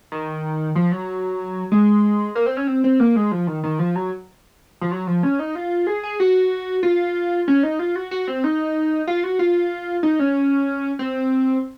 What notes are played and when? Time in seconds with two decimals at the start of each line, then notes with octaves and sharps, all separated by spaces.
0.12 D#3
0.75 F3
0.92 F#3
1.72 G#3
2.35 A#3
2.46 C4
2.57 C#4
2.67 C4
2.84 C4
3.00 A#3
3.16 G#3
3.32 F3
3.47 D#3
3.64 D#3
3.79 F3
3.95 F#3
4.81 F3
4.91 F#3
5.07 F3
5.23 C#4
5.39 D#4
5.55 F4
5.87 G#4
6.03 G#4
6.20 F#4
6.83 F4
7.48 C#4
7.63 D#4
7.79 F4
7.95 F#4
8.11 F#4
8.28 C4
8.44 D#4
9.07 F4
9.23 F#4
9.39 F4
10.03 D#4
10.20 C#4
10.99 C4